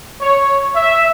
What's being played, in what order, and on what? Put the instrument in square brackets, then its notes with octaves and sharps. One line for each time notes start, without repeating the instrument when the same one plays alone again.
[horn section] C#5
E5